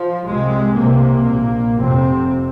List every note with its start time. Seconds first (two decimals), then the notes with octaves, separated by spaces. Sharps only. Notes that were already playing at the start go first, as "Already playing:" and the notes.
Already playing: F3
0.24 C2 C3 G#3
0.74 C2 C3 A#3
1.25 A#1 A#2
1.75 F1 F2 C3 C4